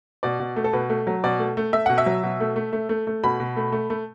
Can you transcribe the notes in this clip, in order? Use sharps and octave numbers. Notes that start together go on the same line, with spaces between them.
B2 D5
B2
A3
A4
B2 B4
A3
F#3
B2 D5
A3
A3
A3 E5
B2 F#5
E5
F#3
B2
A3
A3
A3
A3
A3
B2 B5
B2
A3
A3
A3